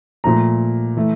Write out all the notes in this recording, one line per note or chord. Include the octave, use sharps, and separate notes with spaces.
A#2 F3 A3 A#5
E3 A3